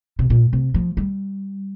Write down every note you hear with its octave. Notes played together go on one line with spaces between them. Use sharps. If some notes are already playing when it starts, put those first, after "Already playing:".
C3
A#2
C3
F3
G3